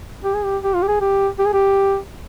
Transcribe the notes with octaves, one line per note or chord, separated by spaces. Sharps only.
G4
G#4
G4
G4
F4
G4
G#4
G4
G4
G#4
G4